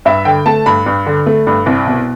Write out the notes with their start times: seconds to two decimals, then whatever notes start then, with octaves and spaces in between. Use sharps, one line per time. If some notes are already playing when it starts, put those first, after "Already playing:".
0.05 G2 E5
0.25 D3 G5
0.46 A3 A5
0.66 G2 B5
0.86 G2
1.06 D3
1.26 A3
1.47 G2
1.66 C2
1.87 B2